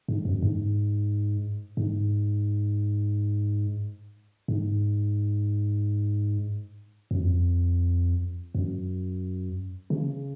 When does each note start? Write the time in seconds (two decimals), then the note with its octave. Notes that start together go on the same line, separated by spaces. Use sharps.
0.08 G#2
0.25 F#2
0.42 G#2
1.77 G#2
4.48 G#2
7.11 F#2
7.20 F2
8.55 F#2
9.90 C#3